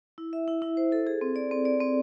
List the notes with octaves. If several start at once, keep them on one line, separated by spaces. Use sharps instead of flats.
E4
E5
E4
E4
C5
A4
G#4
C4
D5
C4
D5
C4